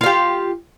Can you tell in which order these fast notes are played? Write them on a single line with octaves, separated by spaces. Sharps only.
F4 F5 G4